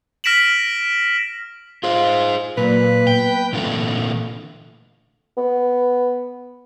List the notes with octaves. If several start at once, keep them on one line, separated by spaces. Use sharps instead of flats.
F6 A#6 B6 D7 E7 F#7
F4 G#4 C5
A#2 F#3 A#3 B4 D5
B3 G5
A#2 D3 E3 A3
B3